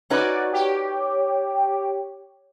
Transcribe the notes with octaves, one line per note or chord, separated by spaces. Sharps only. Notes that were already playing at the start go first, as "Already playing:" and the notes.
C#4 D#4 F#4 B4 D5
G4 C#5